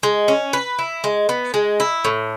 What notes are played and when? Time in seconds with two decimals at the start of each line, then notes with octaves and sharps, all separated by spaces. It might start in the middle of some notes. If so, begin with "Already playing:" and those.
0.03 G#3
0.28 C#4
0.53 B4
0.79 E4
1.04 G#3
1.29 B3
1.54 G#3
1.80 E4
2.05 A2